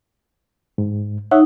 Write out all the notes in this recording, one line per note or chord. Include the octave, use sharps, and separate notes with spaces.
G#2
D#4 C#5 E5 F#5